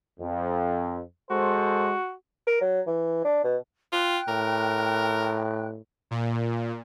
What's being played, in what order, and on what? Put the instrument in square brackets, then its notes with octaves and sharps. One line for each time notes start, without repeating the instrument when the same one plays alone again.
[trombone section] F2
[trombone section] G#3 A4 C5 [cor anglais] F#4
[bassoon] A#4
F#3
E3
D4
B2
[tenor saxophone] F4 [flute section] G5 F#6
[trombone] A2 [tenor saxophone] A#4
[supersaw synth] A#2